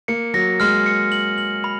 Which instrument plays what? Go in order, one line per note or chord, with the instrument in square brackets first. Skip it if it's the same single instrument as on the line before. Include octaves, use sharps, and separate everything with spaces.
[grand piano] A#3 [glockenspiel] C#7
[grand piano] F#3 [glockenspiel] A#6
[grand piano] G#3 [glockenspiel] F6
[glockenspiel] C#7
F#7
F#7
B5